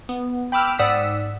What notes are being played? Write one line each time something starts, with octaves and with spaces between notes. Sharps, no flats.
B3
G5 B5 D6 E6 F6
G#2 D5 F#5 D#6 E6 B6